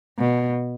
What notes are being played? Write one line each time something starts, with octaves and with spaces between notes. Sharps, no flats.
B2